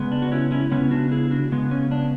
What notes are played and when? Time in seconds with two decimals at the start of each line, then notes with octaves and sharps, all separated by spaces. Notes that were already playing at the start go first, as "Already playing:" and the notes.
Already playing: C#3 G#3 B3
0.12 D4
0.22 F#4
0.32 C#4 E4
0.52 C#4 E4
0.71 C#3 G#3 B3 C#4 E4
0.91 D4 F#4
1.11 E4 G#4
1.31 D4 F#4
1.52 C#3 G#3 B3
1.71 C#4
1.91 D4